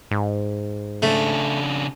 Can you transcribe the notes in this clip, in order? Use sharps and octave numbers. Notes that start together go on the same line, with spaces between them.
G#2
C#3 A3 D4